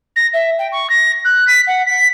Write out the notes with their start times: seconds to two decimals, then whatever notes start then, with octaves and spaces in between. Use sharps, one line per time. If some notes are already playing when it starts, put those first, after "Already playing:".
0.16 A#6
0.34 E5
0.59 G5
0.72 C#6
0.90 A#6
1.25 F#6
1.47 B6
1.67 F#5
1.86 B6